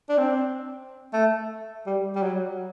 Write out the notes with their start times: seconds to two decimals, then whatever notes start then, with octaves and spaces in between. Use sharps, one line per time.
0.09 D4
0.18 C4
1.13 A3
1.86 G3
2.15 G3
2.22 F#3